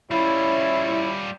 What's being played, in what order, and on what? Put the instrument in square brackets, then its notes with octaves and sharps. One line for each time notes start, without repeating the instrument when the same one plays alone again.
[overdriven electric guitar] G3 F4 [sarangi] C#4 [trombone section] E4 [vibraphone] B5